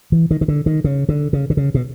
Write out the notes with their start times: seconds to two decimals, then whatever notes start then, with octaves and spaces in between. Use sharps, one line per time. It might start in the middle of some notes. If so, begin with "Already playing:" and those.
0.12 E3
0.31 D#3
0.41 D#3
0.48 D3
0.66 D#3
0.84 C#3
1.09 D3
1.33 C#3
1.50 D3
1.57 C#3
1.75 B2